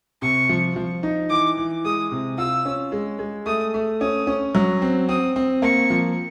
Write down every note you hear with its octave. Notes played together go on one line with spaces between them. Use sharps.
C3 C#6
F3
F3
D#4
E3 D6
E3
G#3 D#6
C3
F4 E6
C#4
G#3
G#3
A3 D#6
A3
C#4 D#6
C#4
F#3
C4
C4 D#6
C4
A#3 C#6
F3